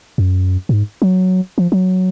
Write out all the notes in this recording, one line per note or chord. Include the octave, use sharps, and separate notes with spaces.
F#2
A#2
G#2
F#3
F3
F#3